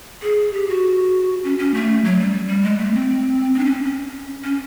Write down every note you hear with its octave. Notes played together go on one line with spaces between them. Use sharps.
G#4
G4
F#4
C#4
C#4
A3
F#3
G3
G3
G#3
A3
C4
C4
D4
C#4
C#4
C#4